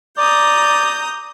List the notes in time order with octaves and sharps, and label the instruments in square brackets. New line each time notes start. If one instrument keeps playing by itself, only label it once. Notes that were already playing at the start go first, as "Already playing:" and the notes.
[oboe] D5 [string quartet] A#5 D#6 G6